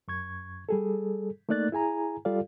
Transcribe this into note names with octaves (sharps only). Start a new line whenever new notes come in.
F#2 C#6 G#6
G3 G#4 A4
A3 A#3 D#4 D5 F#6 A6
E4 G#4 G#5 A#5
G3 F4 G4 A4 D5 F5